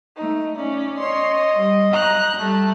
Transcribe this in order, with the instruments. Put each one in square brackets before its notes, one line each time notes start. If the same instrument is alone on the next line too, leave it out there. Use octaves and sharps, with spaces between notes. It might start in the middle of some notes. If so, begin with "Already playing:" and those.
[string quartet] A3 D#4
C#4 D5
[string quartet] C#5 C6 [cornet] D#5
[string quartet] G3
A#5 F#6 G6
G3 A3